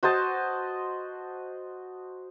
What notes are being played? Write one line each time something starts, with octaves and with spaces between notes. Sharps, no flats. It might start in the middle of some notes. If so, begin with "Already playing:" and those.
F#4 C5 D#5 A5